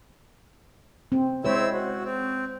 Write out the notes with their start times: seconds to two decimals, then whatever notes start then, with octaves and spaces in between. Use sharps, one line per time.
1.12 C4
1.45 G#3 C4 E4 C5 C#5 E6
1.72 F#4
2.05 C4